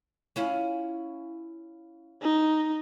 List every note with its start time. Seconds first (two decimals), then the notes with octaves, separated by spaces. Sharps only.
0.36 C#4 E4 F4
2.23 D#4